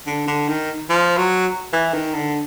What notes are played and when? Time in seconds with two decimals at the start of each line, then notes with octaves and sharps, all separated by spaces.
0.07 D3
0.28 D3
0.49 D#3
0.90 F3
1.18 F#3
1.73 E3
1.94 D#3
2.15 D3